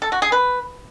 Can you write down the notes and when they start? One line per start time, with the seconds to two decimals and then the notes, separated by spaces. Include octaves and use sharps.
0.02 A4
0.12 F#4
0.22 G#4
0.32 B4